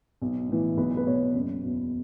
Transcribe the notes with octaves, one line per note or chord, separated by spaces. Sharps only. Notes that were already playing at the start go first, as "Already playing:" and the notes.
B1
A2 E3
B1 B4
B4
B2 C#5
F#1
E2 B2